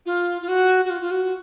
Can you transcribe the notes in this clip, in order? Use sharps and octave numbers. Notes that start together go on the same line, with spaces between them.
F4
F4
F#4
F#4
F4
F4
F#4